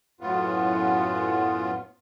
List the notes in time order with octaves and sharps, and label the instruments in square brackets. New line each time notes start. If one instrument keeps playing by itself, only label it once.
[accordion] F#2 A2 B3 F4